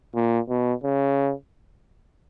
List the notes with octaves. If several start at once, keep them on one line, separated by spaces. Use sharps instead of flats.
A#2
B2
C#3